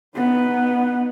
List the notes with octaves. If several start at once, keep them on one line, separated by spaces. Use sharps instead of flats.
B3 D#4